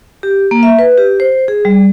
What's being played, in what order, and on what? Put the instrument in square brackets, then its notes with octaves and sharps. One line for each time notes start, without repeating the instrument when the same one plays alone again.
[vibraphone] G4
A#3
E5
B4
G4
C5
G#4
G3